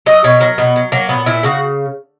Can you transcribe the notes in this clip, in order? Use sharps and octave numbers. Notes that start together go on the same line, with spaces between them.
F#3 D#5
B2 C#5
F#3 A#4
B2 B3
F#3
F#3 A#3
A#2 B3
A#2 E4
C#3 F#4